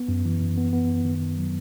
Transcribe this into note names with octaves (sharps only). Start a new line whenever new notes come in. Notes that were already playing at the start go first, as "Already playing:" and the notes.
Already playing: B3
F#2
E3
F#2
B3
B3
F#2
D#3
D#3
F#3